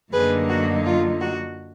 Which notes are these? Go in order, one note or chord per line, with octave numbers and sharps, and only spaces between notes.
F#2 D3 F#3 A#3 D#4 G#4 B4
F#4
F4
F#4